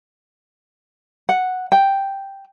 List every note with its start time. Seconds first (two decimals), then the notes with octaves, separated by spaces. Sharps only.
1.29 F#5
1.72 G5